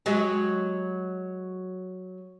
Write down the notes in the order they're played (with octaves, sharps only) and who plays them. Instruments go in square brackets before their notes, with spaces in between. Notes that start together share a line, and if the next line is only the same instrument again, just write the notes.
[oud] F#3 G#3